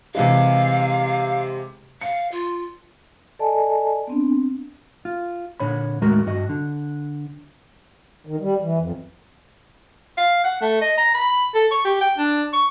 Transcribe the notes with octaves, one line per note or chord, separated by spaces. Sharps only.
C3 E3 G#3 F5
F5 C#7
F4
A4 D5 D#5 G#5 A5
B3 C4 D4
F4
A#2 D3 C#5 B5
D#2 A2 G#3 F#4 A#4 A#5
G2 F#4 D#5
D3
D#3
G3
E3
F2
F5
F#5
A3
D#5
A#5
B5
A4
C#6
G4
G5
D4
C#6